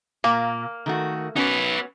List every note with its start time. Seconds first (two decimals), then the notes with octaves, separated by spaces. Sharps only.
0.24 A#2 A#3
0.86 D#3 A3 F#4
1.36 B3 C#4 D#4 F#4 B4